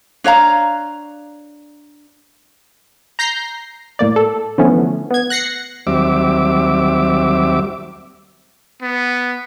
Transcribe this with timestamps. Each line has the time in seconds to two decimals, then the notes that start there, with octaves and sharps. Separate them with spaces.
0.24 D4 C#5 F5 A#5
3.19 A#5 G6 A#6 C7
3.99 A2 A#3 D5
4.16 A4
4.58 D3 E3 F3 A3 B3 C#4
5.11 B3 G#6
5.30 F#6 A#6 C7 C#7
5.87 D#2 F#3 G3 C4 E5 D6
8.82 B3